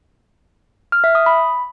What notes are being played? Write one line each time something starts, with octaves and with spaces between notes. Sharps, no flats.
F6
E5
D#6
B5